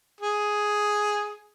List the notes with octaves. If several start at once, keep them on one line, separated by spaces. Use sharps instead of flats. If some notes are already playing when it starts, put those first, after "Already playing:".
G#4